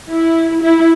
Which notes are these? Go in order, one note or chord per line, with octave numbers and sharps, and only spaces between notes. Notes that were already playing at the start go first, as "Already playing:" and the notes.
E4
E4